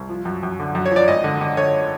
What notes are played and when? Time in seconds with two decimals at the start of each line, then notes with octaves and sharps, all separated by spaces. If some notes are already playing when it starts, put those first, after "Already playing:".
Already playing: C2
0.09 F3
0.25 F#2
0.43 F#2
0.59 D3
0.75 F#2
0.86 C#5
0.92 F3 D5
1.08 G#1 D#5
1.24 D3
1.41 D3
1.57 D3 C#5